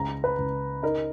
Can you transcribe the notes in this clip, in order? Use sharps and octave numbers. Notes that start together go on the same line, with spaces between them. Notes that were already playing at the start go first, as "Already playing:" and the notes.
Already playing: C#2 G#3 A#5
B4
C#2
D#4 A#4